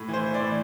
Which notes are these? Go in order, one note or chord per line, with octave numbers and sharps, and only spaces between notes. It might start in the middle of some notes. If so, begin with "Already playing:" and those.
Already playing: A2
E3
C5
E3
D5
A2